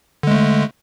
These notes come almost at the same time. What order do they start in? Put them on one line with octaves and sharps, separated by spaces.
D3 G#3 A3